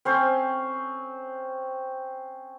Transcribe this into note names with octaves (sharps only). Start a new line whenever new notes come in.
C4 C#4 C5